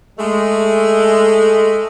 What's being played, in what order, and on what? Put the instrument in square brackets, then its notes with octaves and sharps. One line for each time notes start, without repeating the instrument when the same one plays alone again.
[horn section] G#3 A3